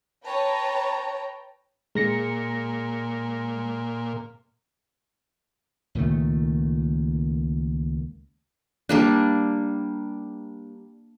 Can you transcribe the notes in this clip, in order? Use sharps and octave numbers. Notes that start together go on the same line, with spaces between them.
B4 C#5 G5 A5 A#5
A#2 G#3 A#6 C#7
C#2 A#2 D#3 A3
G3 A#3 D4